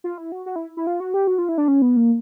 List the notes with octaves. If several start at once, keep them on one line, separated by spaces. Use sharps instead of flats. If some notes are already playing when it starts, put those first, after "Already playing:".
F4
E4
F#4
F#4
E4
E4
F4
F#4
G4
F#4
F4
E4
D4
C#4
B3
A#3